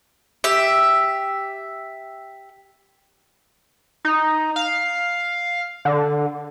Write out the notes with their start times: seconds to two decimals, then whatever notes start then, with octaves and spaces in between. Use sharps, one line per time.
0.44 G4 E5
4.05 D#4
4.56 F5
5.85 D3